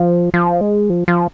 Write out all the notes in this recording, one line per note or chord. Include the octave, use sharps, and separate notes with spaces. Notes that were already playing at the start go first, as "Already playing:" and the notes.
Already playing: F3
F3
G#3
F3
F3